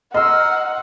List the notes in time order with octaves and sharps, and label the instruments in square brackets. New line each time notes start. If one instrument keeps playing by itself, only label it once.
[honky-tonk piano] D#5 [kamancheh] F#5 [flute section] A#5 F6 [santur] C6 E6